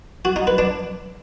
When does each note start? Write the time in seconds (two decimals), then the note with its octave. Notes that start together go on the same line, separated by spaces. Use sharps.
0.25 F#4
0.36 D#4
0.47 B4
0.58 D4